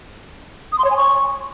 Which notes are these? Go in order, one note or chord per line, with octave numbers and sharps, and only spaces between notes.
D#6
C6
C#5
G#5
C#6